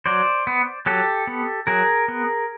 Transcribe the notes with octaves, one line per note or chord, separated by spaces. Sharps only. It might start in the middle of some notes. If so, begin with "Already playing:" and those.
F#3 C5 D5
B3
F#3 G4 A4
B3
F#3 G#4 A#4
B3